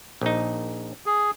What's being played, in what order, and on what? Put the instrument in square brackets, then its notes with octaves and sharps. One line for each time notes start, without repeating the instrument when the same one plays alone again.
[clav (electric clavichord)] A#1 D#4
[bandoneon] G#4